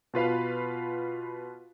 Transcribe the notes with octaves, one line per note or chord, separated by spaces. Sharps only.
B2 F4 B4 F5